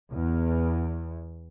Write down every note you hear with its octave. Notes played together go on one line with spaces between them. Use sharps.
E2